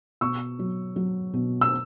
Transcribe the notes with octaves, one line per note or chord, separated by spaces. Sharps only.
B2 C#6 E6
F#3
F#3
B2
E6